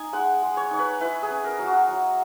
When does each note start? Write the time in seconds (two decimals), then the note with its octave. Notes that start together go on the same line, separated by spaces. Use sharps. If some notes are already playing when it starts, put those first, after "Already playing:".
Already playing: D#4 G#5
0.13 G#3 F#5
0.42 G#3
0.57 C#5
0.71 D#4 C#5
0.79 B4
1.00 E4 B4
1.22 G#4
1.30 C#4
1.44 A#4
1.59 F#3
1.67 F#4
1.88 F#3